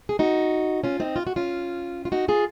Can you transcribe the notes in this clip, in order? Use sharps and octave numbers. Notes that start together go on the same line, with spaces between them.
G#4
D#4 F#4
C#4 F4
C4 D#4
F4
F#4
C#4 F4
F4
D#4 F#4
F4 G#4